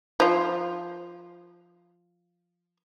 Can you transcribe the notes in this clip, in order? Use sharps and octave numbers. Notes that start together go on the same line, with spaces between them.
F3 F4